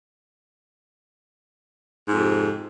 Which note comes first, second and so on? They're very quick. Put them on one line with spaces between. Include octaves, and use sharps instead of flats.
G#2 F2 C3